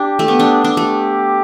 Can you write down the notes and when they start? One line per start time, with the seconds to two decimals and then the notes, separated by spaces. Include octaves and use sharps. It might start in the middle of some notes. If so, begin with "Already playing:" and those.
Already playing: D4 G4
0.19 A3
0.28 B3
0.39 D4
0.64 D4
0.77 A3 G4